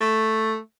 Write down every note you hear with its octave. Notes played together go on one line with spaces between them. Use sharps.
A3